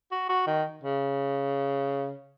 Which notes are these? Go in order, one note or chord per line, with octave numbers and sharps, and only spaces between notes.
F#4
F#4
D#3
C#3